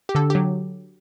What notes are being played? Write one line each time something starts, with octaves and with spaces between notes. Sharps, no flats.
G4
D3 A4
F#3 G4